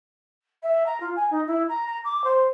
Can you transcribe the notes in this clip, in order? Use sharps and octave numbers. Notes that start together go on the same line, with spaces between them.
E5
A#5
F4
G#5
D#4
E4
A#5
A#5
D6
C5